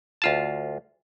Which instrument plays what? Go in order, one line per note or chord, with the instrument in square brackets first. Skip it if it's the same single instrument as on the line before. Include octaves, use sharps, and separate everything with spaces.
[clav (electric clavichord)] D2 F4 A5